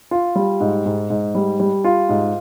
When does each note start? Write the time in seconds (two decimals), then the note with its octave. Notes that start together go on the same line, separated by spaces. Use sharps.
0.11 F4
0.36 G3
0.61 G#2
0.86 G#2
1.10 G#2
1.35 G3
1.60 G3
1.84 F4
2.09 G#2